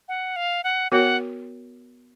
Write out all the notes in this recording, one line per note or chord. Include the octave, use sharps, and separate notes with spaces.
F#5
F5
F#5
B3 F#4 A#4 C#5 F#5